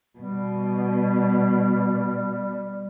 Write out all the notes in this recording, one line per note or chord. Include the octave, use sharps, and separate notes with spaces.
B2 G3